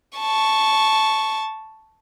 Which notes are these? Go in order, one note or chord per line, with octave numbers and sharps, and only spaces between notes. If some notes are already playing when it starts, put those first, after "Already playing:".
A5 C#6